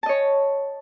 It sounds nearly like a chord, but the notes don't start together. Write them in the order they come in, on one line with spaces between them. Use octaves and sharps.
A5 D#5 C#5